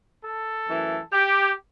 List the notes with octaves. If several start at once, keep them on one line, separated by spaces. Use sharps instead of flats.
A4
F#2 E3 A3
G4